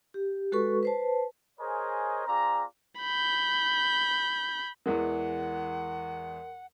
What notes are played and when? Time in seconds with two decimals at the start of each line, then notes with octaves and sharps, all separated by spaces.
0.14 G4
0.52 G#3 F#4 A4 B4 C#6
0.83 B4 C5 A5
1.60 G#4 A#4 C5 C#5 D#5 G#5
2.27 C4 F4 G#4 D5 A#5
3.00 B5 G6
4.86 E2 E3 G#3 A#4 F#5